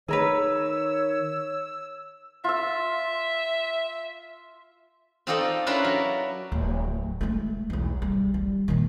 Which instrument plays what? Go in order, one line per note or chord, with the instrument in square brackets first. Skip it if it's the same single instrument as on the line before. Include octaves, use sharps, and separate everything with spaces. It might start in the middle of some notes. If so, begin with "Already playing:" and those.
[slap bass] D#3 [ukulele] G#4 A#4 B4 [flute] C#5 [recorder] E6
[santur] F4 E6 [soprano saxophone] E5
[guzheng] C4 D#4 F4 A4 D5 D#5
C#4 D4 E4 F4 A#4 B4
F#3
[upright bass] D1 F#3
G#3 A3
B1 E2
G3
G3
A#2 D#3